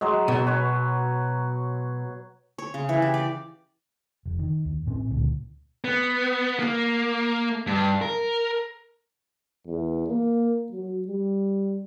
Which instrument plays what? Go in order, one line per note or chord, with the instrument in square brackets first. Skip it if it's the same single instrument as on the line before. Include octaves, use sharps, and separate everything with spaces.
[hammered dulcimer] F#3 G#3
[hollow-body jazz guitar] B2 [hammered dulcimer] F#3
[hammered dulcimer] B4 C#5
[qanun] C#5
C#3
E3
G4
D5
[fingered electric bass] F1
D#3
D#2
A1 A2 C4 C#4
C#2 A#2 D3 A3
[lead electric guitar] B3
A#3
G2
A#4
[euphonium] E2
A#3
F#3
G3